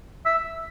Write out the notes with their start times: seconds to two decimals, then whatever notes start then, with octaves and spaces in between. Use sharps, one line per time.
0.25 E5